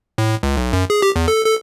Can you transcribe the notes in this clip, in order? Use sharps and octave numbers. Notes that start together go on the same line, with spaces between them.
A2
C#2
B1
F#2
G#4
G4
E2
A4
A4